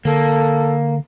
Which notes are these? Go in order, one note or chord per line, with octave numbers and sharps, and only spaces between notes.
D3 A#3 A4